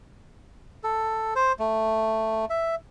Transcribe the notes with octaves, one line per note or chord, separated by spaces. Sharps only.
A4
C5
A3
E5